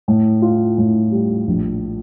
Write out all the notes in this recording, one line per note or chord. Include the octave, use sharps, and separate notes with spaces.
A2
F4
A2
G3
A#1